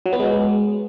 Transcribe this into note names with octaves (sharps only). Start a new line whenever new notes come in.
F#3
B3
G#3